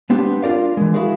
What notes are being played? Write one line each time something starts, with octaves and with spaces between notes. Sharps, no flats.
G#3 B3 C4 D4 G4
D4 F4 A#4 D5 F5
E3 G#3
E4 F#4 G#4 A#4 F5